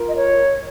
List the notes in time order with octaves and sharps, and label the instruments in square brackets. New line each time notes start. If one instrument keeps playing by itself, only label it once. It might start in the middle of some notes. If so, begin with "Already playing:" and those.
Already playing: [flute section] F4 A#4
D#5
C#5